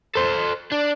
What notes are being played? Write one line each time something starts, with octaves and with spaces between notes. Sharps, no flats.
A4 C5
D4